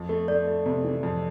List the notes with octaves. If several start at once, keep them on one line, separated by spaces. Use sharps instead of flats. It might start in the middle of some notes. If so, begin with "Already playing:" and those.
Already playing: F2
A3
A3 D5
A3
C3
E3
F2